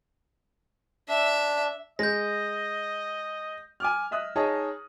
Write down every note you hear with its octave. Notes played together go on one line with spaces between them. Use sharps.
D4 E5
G#3 D#5 G6 A#6
G#5 D6 F6
D#5 E5 D#6 F#6
D#4 G#4 C#5 D#5 A5